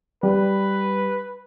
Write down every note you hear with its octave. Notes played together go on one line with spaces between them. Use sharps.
G3 B4